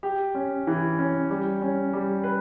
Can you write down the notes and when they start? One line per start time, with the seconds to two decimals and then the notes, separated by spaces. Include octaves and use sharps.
0.03 G4
0.35 C#4
0.67 E3
0.99 C#4
1.30 G3
1.62 C#4
1.93 G3
2.24 B4